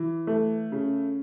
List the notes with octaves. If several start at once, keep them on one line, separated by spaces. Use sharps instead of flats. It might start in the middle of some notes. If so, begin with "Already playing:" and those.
Already playing: E3
A3
C#3